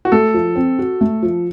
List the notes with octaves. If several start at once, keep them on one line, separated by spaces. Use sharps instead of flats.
F#4
A3 A4
F3
C4
F#4
A3
F3